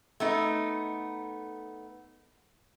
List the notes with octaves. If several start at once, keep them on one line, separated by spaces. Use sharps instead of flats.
A3 B3 D#4